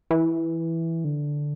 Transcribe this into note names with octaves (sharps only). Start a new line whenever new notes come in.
E3
D3